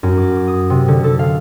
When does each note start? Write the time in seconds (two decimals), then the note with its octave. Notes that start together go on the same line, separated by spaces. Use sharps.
0.03 F#2
0.18 D6
0.48 D#6
0.70 C3
0.88 D3
1.04 A4
1.19 F5